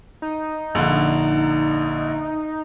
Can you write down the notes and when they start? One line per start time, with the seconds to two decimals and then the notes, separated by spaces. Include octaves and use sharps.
0.22 D#4
0.75 A#1 D3